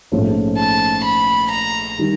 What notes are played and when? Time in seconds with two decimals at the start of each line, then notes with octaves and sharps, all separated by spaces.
0.12 A#1 G#2 F3 A3 C#4
0.58 A5
1.05 B5
1.52 A#5
1.99 D#3 G3